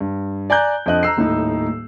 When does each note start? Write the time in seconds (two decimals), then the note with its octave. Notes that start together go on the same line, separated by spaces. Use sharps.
0.01 G2
0.50 D5 G#5 A#5 F#6 G6
0.86 F2 D4 D#5 F#6
1.03 A#5 E6 C7
1.17 D#1 A2 D#4